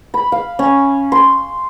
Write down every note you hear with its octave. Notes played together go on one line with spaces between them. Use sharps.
B5
F5
C#4
C6